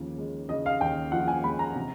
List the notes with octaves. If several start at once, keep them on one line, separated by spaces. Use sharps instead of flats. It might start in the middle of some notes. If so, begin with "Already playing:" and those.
Already playing: D#2 C#3 F3
G#3
C#3 D#5
F5
D#2 G5
F3 F#5
G#5
G#3 B5
A#5
C3